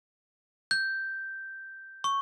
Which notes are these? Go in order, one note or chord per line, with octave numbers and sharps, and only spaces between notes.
G6
C#6